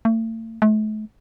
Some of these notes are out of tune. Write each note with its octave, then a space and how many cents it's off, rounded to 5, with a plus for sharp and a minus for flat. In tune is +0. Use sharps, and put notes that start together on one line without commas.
A3 +40
A3 -40